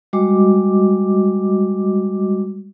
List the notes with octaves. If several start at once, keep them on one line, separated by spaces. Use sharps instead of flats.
G3 G#3 F#4 D#5 D6